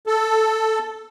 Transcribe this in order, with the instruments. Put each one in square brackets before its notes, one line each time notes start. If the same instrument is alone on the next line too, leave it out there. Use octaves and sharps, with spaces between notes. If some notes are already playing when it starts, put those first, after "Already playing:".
[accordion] A4